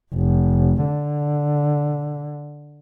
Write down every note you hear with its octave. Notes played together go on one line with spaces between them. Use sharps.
F1
D3